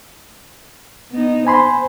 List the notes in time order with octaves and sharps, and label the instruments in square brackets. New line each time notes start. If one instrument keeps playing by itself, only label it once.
[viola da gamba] B3 D#4
[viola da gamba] C5 [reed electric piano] G#5 B5 C6